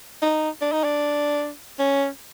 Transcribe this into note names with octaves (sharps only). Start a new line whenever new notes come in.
D#4
D4
D#4
D4
C#4